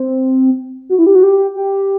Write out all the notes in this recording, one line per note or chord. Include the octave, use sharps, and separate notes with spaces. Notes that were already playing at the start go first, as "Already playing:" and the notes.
Already playing: C4
F#4
E4
G4
F#4
G4
G4